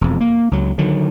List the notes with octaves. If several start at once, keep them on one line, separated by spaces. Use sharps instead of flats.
E1 F2
A#3
C#2 F#3
D3 D#3 F#3